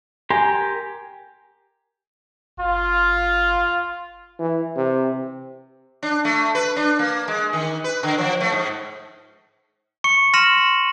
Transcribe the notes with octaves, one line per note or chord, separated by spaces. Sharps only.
G4 A#4 G#5 C6
G1 F4
E3
C3
D4
A3
B4
D4
A#3
G#3
D#3
B4
D3
F3
A3
G#2
C#6 C#7
C6 F6 A#6 D#7 E7 F#7